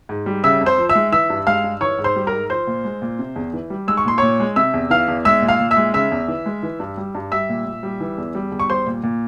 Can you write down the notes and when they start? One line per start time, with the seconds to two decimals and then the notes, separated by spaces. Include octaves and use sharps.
0.09 G#2
0.26 G3
0.44 C#3 E5 E6
0.61 F2
0.66 C5 C6
0.78 F3
0.89 E5 E6
0.95 G#3
1.12 E3 E5 E6
1.30 G2
1.47 G#3 F5 F6
1.64 G2
1.81 E3 C#5 C#6
1.98 G#2
2.04 C5 C6
2.16 G3
2.27 A#4 A#5
2.32 G#2
2.50 F3 C5 C6
2.67 A#2
2.85 G#3
3.02 A#2
3.19 C3
3.36 E2
3.53 E3
3.70 G3
3.88 G#3 E6
3.97 C#6
4.05 A#2 C6
4.18 A#2 C#5 C#6
4.40 G#3
4.56 C3 E5 E6
4.74 E2
4.90 E3 F5 F6
5.08 E2
5.25 G#3 E5 E6
5.42 A#2
5.48 F5 F6
5.60 A#2
5.71 E5 E6
5.77 G#3
5.94 C#3 E5 E6
6.12 E2
6.28 E3
6.46 G#3
6.63 E3
6.80 G2
6.97 G3
7.15 G2
7.32 G3 E5 E6
7.49 A#2
7.66 A#2
7.83 G3
8.00 E3
8.18 E2
8.35 G3
8.52 E2
8.60 C#6
8.70 G3 C5 C6
8.87 A#2
9.03 A#2